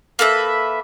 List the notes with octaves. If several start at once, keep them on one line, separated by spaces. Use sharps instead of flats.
A#3 A4 B4 E5